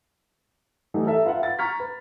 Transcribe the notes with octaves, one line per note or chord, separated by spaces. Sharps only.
E3 F#3 G3 A3 D#4
A4 A#4 E5
F4 B4 E5 F#5
F5 F#5 A6
A#5 C#6 F6 G#6 B6
B4